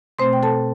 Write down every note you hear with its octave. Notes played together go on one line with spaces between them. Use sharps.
B2 A3 C4 C5 C6
G5
A4 A5